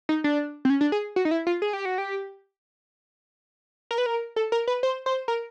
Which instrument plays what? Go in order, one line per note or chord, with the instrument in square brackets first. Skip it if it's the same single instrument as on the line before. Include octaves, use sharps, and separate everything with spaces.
[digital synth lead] D#4
D4
C4
C#4
D4
G#4
F#4
D#4
E4
F4
G#4
G4
F#4
G4
A#4
B4
A#4
A4
A#4
B4
C5
C5
A#4